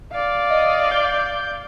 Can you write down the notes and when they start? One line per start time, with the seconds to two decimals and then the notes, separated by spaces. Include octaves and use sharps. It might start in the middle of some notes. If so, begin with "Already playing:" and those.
0.12 D5 F5
0.50 D#5
0.91 G6